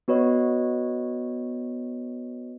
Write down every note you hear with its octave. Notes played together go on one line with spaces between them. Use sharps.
B3 F#4 B4 C#5 D#5